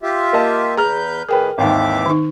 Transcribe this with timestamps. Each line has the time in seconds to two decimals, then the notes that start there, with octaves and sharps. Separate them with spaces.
0.03 F4 G4 E5
0.33 A#3 D#5 A5
0.77 E2 G#4 B4 A#5 F6 G6
1.29 A2 D#3 G#4 A#4 B4 G5
1.58 G#1 D#2 G#2 E3 E5 D6
2.06 D#3 D#4